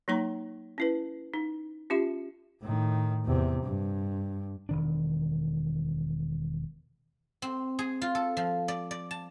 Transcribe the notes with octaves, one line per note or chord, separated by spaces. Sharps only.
F#3 A#3 D#4 A#5 C#6
C#4 E4 B4
D#4
C#4 F4 G4 E5
A2 D#3
E2 C3
G2
E1 D#3 D4
C4
G#4
F4
A4
F3
D5
D5
A5